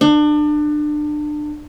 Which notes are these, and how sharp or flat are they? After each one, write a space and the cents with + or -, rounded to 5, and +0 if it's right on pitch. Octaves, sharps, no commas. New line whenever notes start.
D4 +30